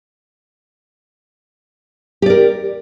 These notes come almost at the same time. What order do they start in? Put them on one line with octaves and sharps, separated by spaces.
G4 D5 A#4